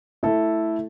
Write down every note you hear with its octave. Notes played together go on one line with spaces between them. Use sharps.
A3 E4 A4